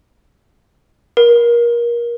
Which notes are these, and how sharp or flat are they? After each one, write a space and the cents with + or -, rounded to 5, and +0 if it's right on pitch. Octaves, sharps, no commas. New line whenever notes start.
A#4 +25